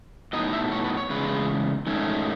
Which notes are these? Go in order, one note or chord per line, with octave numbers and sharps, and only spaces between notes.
A2 F#3 B3 D#4 D#5
E5
C#5
B4
C#5
E2 C#3 G#3 B4
G#2 D#3 A3 C#4